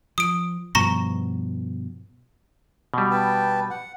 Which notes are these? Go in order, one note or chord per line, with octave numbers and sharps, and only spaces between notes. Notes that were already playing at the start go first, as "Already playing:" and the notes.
F3 D#6 D7
G2 B2 F3 A#5 C#6 A#6
B2 G3
B4 G5 A5
F#5